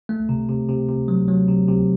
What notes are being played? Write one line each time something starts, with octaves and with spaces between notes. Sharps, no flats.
A3
C3
C3
C3
C3
F#3
F#3
C3
C3